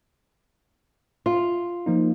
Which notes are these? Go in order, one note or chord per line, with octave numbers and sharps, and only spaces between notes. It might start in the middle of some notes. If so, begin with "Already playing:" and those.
F4
F3 A#3 D#4